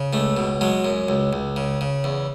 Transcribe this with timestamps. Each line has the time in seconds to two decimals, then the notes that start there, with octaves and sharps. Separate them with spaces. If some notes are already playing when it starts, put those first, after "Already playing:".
Already playing: C#3
0.13 C#2 A3
0.37 B2
0.61 F#3 G#3
0.85 F#2
1.09 C#2
1.33 C#2
1.56 C#3
1.81 C#3
2.04 E2